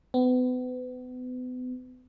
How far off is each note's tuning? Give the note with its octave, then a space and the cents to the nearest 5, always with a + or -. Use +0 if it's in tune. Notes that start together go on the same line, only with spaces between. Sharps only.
B3 +35